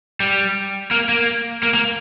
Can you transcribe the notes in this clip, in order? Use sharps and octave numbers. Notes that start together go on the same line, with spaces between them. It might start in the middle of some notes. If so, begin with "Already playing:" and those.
G3
A#3
A#3
A#3
A#3